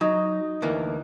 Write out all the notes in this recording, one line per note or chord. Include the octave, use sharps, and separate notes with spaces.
F#3 D#4
D2 E3 A#3